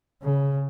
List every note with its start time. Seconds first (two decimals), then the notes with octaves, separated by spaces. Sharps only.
0.23 C#3